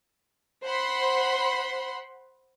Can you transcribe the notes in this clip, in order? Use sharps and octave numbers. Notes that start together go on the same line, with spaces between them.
C5 F#5 B5 C6